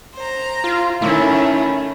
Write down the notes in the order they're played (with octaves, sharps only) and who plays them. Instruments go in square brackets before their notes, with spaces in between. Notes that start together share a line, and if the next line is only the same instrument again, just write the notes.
[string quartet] C5 A#5
[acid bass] F4
[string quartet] D#3 A3 C#4 [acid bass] E4